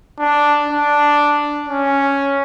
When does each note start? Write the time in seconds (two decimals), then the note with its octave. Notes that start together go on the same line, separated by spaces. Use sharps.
0.19 D4
0.69 D4
1.68 C#4